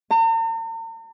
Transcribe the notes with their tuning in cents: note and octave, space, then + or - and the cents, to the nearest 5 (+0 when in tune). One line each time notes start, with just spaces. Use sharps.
A#5 -45